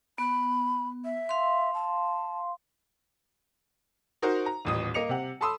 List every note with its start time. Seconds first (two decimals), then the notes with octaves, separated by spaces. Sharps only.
0.18 B3 B5
1.05 E5
1.29 F5 C6
1.74 A5
4.22 D#4 F#4 A#4 C5
4.46 A#5
4.65 D#1 A1 D#6
4.94 A#3 D#5 C#7 F7
5.09 C3 F#5
5.41 A4 A5 B5 C6 D#6 E6